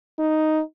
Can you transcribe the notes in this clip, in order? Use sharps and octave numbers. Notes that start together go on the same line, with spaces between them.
D#4